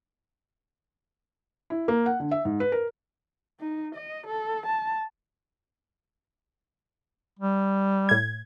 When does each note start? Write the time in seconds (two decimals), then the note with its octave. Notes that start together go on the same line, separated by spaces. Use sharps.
1.70 E4
1.88 A#3
2.06 F#5
2.20 D3
2.31 E5
2.45 G#2
2.60 B4
2.72 A#4
3.59 D#4
3.95 D#5
4.26 A4
4.66 A5
7.39 G3
8.09 A2 G#6